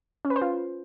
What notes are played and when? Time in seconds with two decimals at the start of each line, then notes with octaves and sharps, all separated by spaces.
0.25 C#4
0.30 B4
0.36 C5
0.42 F4